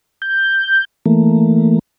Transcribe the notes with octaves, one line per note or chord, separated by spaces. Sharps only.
G6
E3 A3 A#3